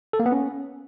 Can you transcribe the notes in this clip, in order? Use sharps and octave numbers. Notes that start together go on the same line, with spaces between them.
A4
A#3
B3
C#4